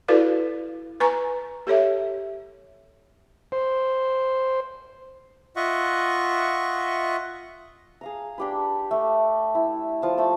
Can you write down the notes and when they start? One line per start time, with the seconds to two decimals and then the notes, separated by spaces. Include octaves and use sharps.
0.08 E4 F#4 A4 B4 D5 F5
1.00 B4 G#5 A#5 C#6
1.67 G4 A4 C#5 E5
3.52 C5
5.56 F4 D#5 E5 F#5 C#6
8.01 G#4 F5 A#5
8.38 D4 G4 B4
8.91 A3
9.55 E4
10.02 F3 A5
10.17 A3 G5 A5 B5